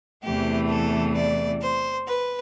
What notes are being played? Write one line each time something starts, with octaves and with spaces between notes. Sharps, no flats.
E2 C3 E3 A3 G4
A4
D5
C5
B4